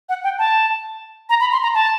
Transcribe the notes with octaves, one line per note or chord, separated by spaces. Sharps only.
F#5
G5
A5
A#5
B5
C6
A#5
A5